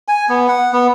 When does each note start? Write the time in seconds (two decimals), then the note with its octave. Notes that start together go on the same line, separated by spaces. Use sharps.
0.08 G#5
0.29 B3
0.48 F#5
0.73 B3